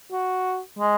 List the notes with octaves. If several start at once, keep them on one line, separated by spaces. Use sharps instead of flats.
F#4
G#3